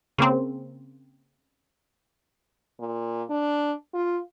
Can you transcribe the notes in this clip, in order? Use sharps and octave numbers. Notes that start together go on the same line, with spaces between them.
C#3 A#3 C4
A#2
D4
F4